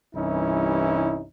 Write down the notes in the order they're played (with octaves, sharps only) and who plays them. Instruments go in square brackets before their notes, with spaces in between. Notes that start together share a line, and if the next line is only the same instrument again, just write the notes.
[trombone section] C2 G2 E3 C#4 D#4 E4